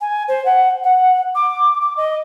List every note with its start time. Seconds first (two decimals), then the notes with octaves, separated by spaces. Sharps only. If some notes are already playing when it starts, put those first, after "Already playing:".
0.01 G#5
0.28 C5
0.45 F#5
0.84 F#5
1.35 D6
1.81 D6
1.97 D#5